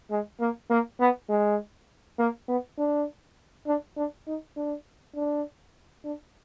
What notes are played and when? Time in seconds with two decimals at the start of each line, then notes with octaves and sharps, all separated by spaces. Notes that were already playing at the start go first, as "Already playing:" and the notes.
0.10 G#3
0.40 A#3
0.70 A#3
1.00 B3
1.29 G#3
2.18 A#3
2.48 B3
2.78 D4
3.66 D4
3.97 D4
4.27 D#4
4.56 D4
5.16 D4
6.05 D4